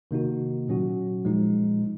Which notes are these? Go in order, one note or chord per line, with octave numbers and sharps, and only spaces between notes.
C3 D#3 A#3 D#4 F#4
A#2 F#3 C#4 F#4
A#2 F3 G#3 D#4